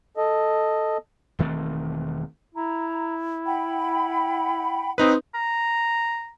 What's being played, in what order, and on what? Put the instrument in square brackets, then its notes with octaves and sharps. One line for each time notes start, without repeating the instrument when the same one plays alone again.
[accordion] A4 D#5
[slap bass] E1 D#3 A3 C4
[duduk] E4 [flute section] A#5
[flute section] F#5 G5 B5
[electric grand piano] C4 D#4 B4 [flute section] C6 D#6
[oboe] A#5